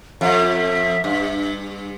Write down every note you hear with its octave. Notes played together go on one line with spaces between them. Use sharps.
F2 E5 F5
G2